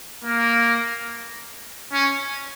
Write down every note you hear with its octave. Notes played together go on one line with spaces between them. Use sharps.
A#3
C#4